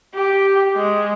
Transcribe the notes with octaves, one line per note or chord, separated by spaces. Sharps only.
G4
G#3